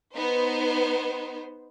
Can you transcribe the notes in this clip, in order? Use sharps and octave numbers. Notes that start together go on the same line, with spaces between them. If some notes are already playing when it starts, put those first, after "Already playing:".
B3 D#4 C5